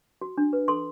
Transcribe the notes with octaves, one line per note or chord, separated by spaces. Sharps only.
F#4
D4
B4
A4 C6